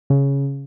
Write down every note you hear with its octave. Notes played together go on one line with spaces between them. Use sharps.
C#3